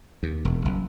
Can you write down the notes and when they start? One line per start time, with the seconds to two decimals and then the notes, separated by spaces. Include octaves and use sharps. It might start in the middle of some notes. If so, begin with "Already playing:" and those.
0.23 D#2
0.45 E1
0.65 F#1